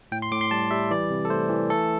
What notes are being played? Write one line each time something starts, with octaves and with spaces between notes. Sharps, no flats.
A2 G5
C6
A2 D6
C6
G3 A5
G3 E5
E3 D5
C3
A4
A3 C5
E3
A3 A4